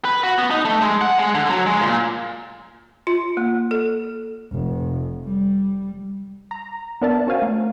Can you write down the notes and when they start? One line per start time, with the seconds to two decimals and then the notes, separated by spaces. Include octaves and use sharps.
0.05 B4
0.23 F#4
0.38 B3
0.51 D#4
0.65 A3
0.82 G#3
1.01 F#5
1.19 G#3
1.35 D3
1.49 F#3
1.66 G#3
1.81 A#2
3.07 F4
3.37 A#3
3.71 A4
4.52 F1
5.25 G3
6.51 A#5
7.02 B3 D4 A#4 D5 E5 A5
7.27 C#4 F#4 C5 F5 G#5
7.42 A3 A#4